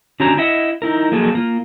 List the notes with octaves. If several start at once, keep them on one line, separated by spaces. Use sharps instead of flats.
D3 C#4 F#4 G4 C#5 A#5
E4 D#5 E5 F#5
D#4 E4 A#4
F3 F#3 A#3 G#4 A4
A#3 F4